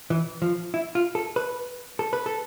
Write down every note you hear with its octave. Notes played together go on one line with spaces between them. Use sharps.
E3
F3
E4
F4
A4
B4
A4
B4
A4